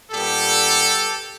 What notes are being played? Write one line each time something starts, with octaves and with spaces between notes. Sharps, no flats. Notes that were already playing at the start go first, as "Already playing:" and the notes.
A#2 G3 B3 D4 G4 A4